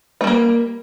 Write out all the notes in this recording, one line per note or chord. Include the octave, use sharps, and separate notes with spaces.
G3 A3 A#3